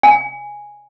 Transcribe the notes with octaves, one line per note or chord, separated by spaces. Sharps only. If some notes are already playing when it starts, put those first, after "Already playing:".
G#5